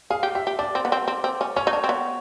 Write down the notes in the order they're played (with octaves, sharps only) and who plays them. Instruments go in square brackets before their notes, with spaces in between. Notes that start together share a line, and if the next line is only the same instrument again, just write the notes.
[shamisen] G#4 [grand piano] F5
[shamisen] G4
[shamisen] G4 [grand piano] E5
[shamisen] G4
[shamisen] D4 [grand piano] D5
[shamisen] C4
B3
C4
C4
C4
C#4
[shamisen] C#4 [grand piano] C#5
[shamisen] D#4
D4
C4
B3